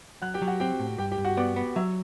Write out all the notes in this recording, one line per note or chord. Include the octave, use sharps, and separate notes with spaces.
F#3 F#5 F#6
G4 G5
F#3
F#4 F#5
C4 G4 G5
A2
G2 G4 G5
G4 G5
G2
F#4 F#5
B3 D5 D6
B3
F#3 E5 E6